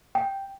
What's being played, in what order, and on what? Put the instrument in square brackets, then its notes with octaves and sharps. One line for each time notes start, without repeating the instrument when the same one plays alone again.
[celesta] G5